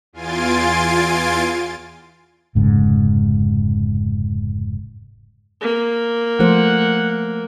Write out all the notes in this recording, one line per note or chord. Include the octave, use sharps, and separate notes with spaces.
E2 F4 G#5 C6 A6 D7
F1 G#2 C#3
A#3
F3 A3 C5 F#5